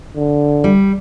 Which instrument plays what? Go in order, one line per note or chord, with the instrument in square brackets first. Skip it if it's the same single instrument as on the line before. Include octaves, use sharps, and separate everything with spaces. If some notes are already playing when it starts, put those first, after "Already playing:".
[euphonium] D3
[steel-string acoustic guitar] G3